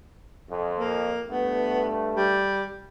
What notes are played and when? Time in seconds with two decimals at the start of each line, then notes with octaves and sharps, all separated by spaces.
0.49 F2
0.77 A#3
1.28 G2 A3 B3
2.15 G3